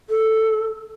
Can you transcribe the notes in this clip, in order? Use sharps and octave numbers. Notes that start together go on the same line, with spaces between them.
A4